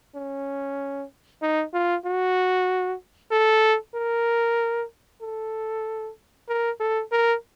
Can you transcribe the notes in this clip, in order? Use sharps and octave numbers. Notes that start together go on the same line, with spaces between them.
C#4
D#4
F4
F#4
A4
A#4
A4
A#4
A4
A#4